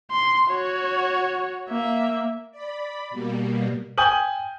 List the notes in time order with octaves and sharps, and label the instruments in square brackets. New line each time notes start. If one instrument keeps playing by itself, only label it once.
[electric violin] C6
F#4 C#5
A#3 E5
[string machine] D5 B5
B2 G3 A#3
[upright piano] G5 G#5 D#6 G6 F#7